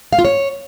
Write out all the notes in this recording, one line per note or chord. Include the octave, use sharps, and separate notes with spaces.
F5
F4
C#5